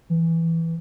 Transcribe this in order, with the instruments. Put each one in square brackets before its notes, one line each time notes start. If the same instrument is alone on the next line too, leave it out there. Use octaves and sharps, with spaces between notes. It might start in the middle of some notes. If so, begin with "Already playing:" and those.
[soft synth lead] E3